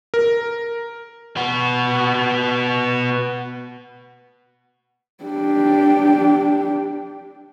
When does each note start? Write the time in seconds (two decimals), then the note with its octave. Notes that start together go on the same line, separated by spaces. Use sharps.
0.14 A#4
1.37 B3 F#4
5.24 D4 G4